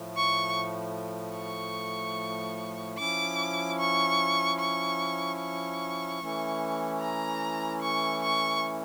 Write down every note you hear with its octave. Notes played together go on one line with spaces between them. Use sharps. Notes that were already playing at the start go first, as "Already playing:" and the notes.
Already playing: A2 F3 A3
C#6
C#6
F3 C#4 E4 D6
C#6
C#6
C#6
E3 A3 C#4 E4
A#5
C#6
C#6